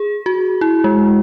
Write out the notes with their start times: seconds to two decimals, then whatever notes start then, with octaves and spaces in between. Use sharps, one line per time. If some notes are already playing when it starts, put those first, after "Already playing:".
Already playing: G#4
0.26 F#4
0.61 E4
0.84 G#3